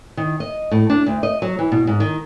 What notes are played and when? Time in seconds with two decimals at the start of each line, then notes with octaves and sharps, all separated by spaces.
0.17 D#3
0.40 D#5
0.71 A2
0.90 D4
1.06 D2
1.23 D#5
1.42 F#3
1.59 E3
1.72 B2
1.87 G#2
2.00 D#3